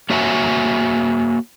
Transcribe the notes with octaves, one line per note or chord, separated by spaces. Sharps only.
A#3 F#4 C#5 E5 F#5 G#5